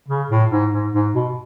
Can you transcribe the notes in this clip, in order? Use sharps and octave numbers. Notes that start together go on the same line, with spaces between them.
C#3
A2
G#2
G#2
G#2
B2